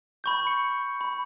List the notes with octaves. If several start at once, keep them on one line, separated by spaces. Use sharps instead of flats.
B5 C#6 G6
C#7
B5